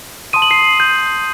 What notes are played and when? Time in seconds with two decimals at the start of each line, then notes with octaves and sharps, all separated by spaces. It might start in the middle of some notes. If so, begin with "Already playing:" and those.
0.33 A5 C6 D#6 D#7
0.42 F#7
0.51 C7 D#7
0.80 G6